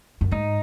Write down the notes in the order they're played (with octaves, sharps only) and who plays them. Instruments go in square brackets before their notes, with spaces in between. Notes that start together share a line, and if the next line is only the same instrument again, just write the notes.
[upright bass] F#2
[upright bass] G#2 [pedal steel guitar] D#4